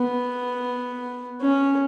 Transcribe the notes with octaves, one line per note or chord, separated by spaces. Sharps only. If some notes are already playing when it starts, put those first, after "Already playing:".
Already playing: B3
C#4